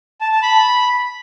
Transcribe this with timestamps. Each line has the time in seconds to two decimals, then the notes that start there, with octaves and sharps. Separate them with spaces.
0.21 A5
0.32 A5
0.42 B5